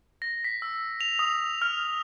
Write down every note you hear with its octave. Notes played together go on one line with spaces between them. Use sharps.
A#6
B6
E6
F7
D#6
F6